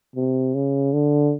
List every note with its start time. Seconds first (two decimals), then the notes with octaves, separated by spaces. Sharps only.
0.16 C3
0.55 C#3
0.93 D3